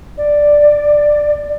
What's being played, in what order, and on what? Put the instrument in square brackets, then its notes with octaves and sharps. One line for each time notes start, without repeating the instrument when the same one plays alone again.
[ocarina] D5